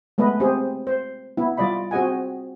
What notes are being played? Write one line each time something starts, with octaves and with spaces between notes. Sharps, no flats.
G#3 A3 B3 B4 D#5
C4 G4 G#4 C5
C5
B3 E4
G3 F4 D5 D#5 B5
C4 F#4 G#4 D#5 F#5 G#5